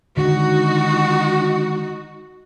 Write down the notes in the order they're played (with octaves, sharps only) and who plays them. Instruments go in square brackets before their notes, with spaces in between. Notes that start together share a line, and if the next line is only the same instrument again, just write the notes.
[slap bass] D3 D#3 G#3 [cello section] D#4 F#4